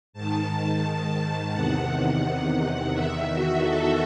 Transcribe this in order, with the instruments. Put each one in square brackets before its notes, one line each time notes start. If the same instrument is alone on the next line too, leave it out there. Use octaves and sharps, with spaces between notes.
[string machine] G#2 D#3 A5
E2 C3 D#3 F#5
E2 D#3 E5
F#4
A4